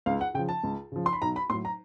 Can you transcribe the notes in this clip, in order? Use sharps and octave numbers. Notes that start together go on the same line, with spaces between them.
C#2 F5
F#5
C#3 F3 G5
A5
C#2
C#3 F3
C6
B5
B1 A#5
B5
A2 F#3 C6
A#5